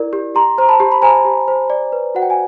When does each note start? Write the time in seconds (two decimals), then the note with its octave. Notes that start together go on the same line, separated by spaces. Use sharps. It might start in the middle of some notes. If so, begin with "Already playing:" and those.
Already playing: E4 A#4 D5
0.13 G4
0.35 G4 A#5 C6
0.58 C5 A#5
0.69 A5 B5
0.80 G4
0.92 B5
1.02 C5 G#5 A#5
1.25 G4
1.48 C5
1.70 D5
1.92 B4
2.15 F#4 F#5
2.22 G5
2.30 G#5